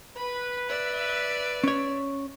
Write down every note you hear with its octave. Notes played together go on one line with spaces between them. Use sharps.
B4 B5
D5 E5
C#4 C#5